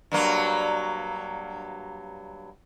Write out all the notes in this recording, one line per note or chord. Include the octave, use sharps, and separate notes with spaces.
G2 F#3 A#3